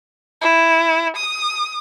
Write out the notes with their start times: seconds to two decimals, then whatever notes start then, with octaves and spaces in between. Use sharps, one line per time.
0.42 E4
1.17 D#6